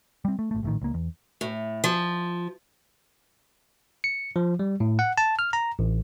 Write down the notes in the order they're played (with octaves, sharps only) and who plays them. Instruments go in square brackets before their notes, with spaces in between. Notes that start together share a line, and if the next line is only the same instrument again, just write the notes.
[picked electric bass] G3 C4
A3
G#1 A3
A#1 A2 D#3
C#2 A#3
E2
[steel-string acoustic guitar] A2
F3
[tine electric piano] C#7
F3
G3
A2
F#5
A5
F6
A#5
A1